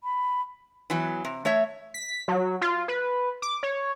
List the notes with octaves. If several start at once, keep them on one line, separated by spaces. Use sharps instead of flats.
B5
E3 F#3 B3
C3
A3 C#5 E5
B6
F#3
F4
B4
D6
C#5